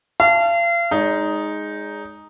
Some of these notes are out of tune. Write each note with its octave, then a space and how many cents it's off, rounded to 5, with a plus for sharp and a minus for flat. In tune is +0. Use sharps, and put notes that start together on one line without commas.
F5 -35 A5 +0
G#3 +0 D#4 +0 D5 -45